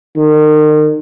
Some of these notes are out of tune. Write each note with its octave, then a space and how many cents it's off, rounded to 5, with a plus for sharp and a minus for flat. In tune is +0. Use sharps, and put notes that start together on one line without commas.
D#3 -35